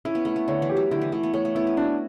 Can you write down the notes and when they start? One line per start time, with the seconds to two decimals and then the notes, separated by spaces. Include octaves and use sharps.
0.05 C#4 E4
0.15 B3
0.25 A3 E4
0.36 B3
0.48 D3 C#5
0.62 E3
0.69 G4
0.77 F#3
0.91 D3 E4
1.01 E3
1.12 A3 E4
1.23 B3
1.34 A3 C#5
1.45 A3
1.55 B3 E4
1.67 C#4
1.77 D4 F#4